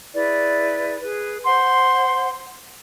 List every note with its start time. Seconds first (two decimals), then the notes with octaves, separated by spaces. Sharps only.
0.14 E4 G#4 B4 D5
1.02 G#4 B4
1.46 C5 F#5 C6